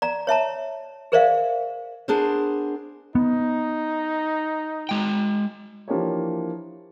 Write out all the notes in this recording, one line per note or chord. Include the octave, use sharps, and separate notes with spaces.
D5 A#5
C#5 E5 A5 A#5
G#4 A#4 C5 D5 E5 F5
B3 D4 G#4 A#4 C5
B3 D#4
G#3 G5
E3 F3 A#3 D4 G4 C#5